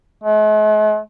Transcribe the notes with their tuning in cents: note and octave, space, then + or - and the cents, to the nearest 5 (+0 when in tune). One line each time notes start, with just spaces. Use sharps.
G#3 +45